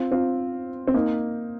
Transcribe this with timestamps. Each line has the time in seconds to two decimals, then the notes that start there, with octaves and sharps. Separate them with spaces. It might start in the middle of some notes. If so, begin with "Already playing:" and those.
Already playing: C4 F4
0.12 C4 F4
0.88 C4
0.94 A#3 D#4